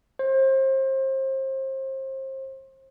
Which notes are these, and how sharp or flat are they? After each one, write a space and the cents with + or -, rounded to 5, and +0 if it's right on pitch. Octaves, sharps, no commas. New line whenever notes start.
C5 +30